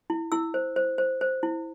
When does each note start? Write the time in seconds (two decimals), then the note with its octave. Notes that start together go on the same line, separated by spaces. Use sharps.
0.10 E4
0.32 E4 E6
0.54 C5
0.76 C5
0.98 C5
1.21 C5
1.43 E4